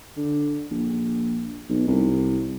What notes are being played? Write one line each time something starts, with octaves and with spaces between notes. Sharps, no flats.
D3
A#1
B1
C2